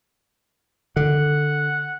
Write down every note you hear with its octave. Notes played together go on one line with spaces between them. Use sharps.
D3 F#5